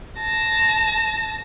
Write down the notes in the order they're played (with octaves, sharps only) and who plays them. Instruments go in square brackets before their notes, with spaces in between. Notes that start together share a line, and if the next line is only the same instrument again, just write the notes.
[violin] A5 A#6